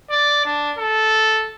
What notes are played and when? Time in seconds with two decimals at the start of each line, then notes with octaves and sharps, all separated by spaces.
0.10 D5
0.45 D4
0.78 A4